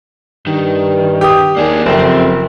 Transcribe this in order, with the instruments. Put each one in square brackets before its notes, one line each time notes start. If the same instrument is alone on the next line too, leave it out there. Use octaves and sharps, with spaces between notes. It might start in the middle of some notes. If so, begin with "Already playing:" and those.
[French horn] G2 [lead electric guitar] D#3
[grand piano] G4 D#6
[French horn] D#2 [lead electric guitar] A#3 G#4 [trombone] D4
[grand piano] F#1 [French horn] F2 [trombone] C3 [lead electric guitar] C4